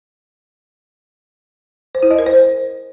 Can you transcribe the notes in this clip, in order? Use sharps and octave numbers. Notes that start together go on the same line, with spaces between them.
C5
E4
D#5
A#4
C5